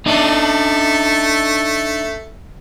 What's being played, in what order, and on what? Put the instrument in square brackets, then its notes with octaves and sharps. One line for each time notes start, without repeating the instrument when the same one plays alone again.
[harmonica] A3 [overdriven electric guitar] D4 D#4